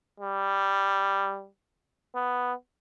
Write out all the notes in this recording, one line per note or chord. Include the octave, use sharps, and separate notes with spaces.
G3
B3